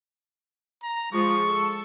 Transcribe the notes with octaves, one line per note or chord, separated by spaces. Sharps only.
A#5
F3 G#3 C#6
A4